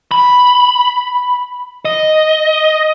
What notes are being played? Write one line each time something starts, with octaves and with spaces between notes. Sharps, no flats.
B5
D#5